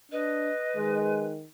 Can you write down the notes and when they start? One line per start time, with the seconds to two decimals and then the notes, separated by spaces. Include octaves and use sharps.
0.12 D4 B4 D#5
0.76 D#3 G#3